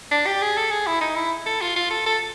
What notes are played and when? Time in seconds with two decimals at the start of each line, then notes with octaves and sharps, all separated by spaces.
0.11 D4
0.26 G4
0.42 G#4
0.57 A4
0.72 G#4
0.87 E4
1.01 D#4
1.16 E4
1.46 A4
1.61 F4
1.76 F4
1.91 A4
2.06 A4